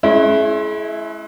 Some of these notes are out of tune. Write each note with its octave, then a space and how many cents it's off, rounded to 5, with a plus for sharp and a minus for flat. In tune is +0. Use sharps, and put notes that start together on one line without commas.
G#3 +40 C#4 -20 E4 +5